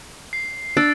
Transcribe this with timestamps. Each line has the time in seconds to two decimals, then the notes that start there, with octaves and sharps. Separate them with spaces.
0.33 C7
0.77 D4 E6 A6 D7